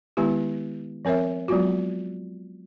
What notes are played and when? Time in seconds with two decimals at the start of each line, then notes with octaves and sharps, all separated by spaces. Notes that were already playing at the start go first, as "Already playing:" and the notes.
0.17 D#3 G#3 B3 E4 G4
1.05 F3 C4 A#4 C#5 E5
1.48 F#3 G#3 B3 F4 F#4